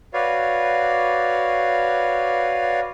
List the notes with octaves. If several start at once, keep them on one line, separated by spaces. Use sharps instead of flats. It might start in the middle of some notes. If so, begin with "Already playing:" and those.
F#4 B4 C#5 D5 F5